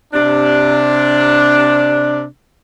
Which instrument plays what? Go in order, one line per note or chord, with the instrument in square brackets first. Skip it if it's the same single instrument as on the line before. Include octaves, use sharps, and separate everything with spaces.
[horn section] C3 D4